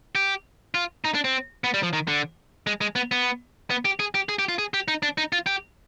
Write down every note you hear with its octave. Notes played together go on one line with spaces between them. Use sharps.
G4
F4
D#4
D4
C4
B3
G3
F3
D#3
D3
G#3
G#3
B3
B3
B3
G4
G#4
G4
G#4
G4
F4
G#4
G4
D#4
D4
D#4
F4
G4